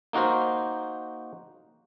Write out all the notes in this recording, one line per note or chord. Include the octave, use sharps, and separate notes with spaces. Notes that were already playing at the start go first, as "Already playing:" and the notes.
A#3 D#4 F#4 A#4 C5